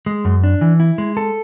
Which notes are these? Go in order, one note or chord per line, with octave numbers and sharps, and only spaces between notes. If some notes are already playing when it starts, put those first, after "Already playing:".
G#3
F#2
D4
E3
E4
G#3
A4